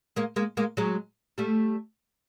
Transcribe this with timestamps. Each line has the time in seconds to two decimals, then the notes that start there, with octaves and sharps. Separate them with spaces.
0.16 G#3 A#3
0.36 G#3 A#3
0.57 G#3 A#3
0.77 F#3 G#3
1.38 G3 A3